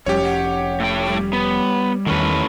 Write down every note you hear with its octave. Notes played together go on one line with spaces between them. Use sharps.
F1 F2 G3 C#4 G4 C#5
F#5
A2 G5
G3
B3
E2 A2 D#3 C#4 B4